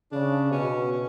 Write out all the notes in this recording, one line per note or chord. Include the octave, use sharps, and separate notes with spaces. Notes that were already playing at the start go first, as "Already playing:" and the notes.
C#3 D4
B2 C#4
C#4